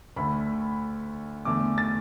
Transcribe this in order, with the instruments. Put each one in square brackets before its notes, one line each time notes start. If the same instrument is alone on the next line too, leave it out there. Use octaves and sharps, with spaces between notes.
[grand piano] D2 D3 A3 B5
E2 D3 A3 D6
A6